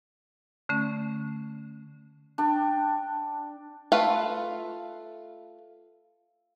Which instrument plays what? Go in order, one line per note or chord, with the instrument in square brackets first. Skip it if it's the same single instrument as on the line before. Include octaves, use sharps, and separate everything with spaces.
[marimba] D3 A3 C#4
[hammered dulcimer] D4 G5
[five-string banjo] A3 F4 B4 F5